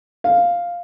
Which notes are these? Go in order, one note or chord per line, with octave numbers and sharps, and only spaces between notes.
F5